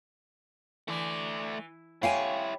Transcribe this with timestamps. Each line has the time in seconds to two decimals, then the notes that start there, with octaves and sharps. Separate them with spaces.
0.88 E3 A3 D5
2.03 E4 G4 C#5 F5 G5 G#5